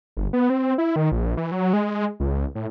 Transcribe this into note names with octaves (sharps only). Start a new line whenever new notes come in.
G1
B3
C4
E4
D#3
A#1
E3
F#3
G#3
C#2
A2